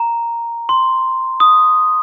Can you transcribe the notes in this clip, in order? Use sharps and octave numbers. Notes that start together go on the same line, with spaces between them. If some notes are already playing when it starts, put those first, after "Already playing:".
Already playing: A#5
C6
D#6